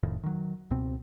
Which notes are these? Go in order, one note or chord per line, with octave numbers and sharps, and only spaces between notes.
F1 F2 A2 D#3
D#3 F#3
C#2 B2 C4